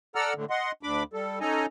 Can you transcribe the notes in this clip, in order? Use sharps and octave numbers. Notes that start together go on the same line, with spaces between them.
A4 D5 F#5 A#5 E6 F6
A2 D3
D#5 F#5 C6
D2 D4 B5 D6
G3 A4
C#4 D#4 A4 D#5 G#5 A#5